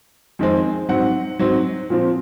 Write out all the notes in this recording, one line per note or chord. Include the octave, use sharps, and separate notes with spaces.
F2 D#3 G#3 C4
G#2 F#3 C4 F#5
G#2 F#3 C4
A#2 F3 C4